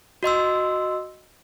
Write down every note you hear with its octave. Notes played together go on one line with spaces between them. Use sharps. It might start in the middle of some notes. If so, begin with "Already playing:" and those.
F#4 D#5 C6 E6